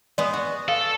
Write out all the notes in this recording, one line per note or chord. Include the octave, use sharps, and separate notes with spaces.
G#3 B3 D5 D#6
F#4
A4 F5